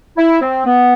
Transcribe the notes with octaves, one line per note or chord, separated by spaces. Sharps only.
E4
C4
B3